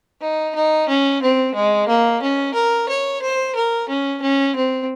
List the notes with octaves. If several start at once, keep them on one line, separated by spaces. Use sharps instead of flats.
D#4
D#4
C#4
C4
G#3
A#3
C#4
A#4
C#5
C5
A#4
C#4
C#4
C4